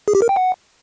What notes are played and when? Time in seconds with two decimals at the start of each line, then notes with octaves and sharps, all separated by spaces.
0.08 G#4
0.15 G4
0.22 A#4
0.29 G5
0.36 F#5